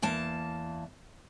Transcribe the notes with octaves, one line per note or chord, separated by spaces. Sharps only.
E2 A#3 A5